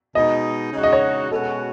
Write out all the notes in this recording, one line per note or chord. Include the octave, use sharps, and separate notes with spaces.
B2 G#3 D#4 D#5
C#3 G#3 D#4 F#4
D#5
C#5
B2 G#3 C#4 F#4 A4